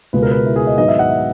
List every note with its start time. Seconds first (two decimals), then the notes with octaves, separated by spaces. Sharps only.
0.13 C#2 B2 G#3 B3 B4
0.22 A#4
0.31 B4
0.46 E4
0.56 G#4
0.67 D#5
0.78 G#2 D#3 F#3 B3 D#5
0.88 E5
0.99 F#5
1.10 E5